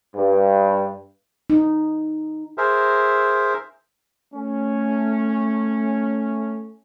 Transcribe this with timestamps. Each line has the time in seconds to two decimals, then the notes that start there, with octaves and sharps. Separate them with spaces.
0.15 G2
1.50 D#4
2.58 G#4 A#4 C5 E5
4.34 A3 C#4